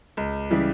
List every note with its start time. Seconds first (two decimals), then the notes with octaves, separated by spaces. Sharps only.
0.17 C#2
0.50 C#3 E3 G3